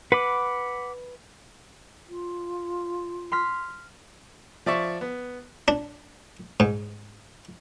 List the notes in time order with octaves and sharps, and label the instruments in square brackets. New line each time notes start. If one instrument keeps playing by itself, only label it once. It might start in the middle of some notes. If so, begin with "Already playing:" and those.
[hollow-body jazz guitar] B4 [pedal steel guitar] F#5 B5 D6
[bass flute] F4
[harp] C6 F6 B6
[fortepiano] F3 D5 E5 C#6
B3
[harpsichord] D4
G#2